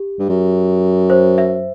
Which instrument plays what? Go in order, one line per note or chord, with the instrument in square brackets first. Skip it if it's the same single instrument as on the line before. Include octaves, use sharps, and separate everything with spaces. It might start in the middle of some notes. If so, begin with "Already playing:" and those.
Already playing: [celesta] G4
[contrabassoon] G2
F#2
[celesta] C5
E5